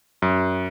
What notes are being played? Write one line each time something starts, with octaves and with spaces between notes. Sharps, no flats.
F#2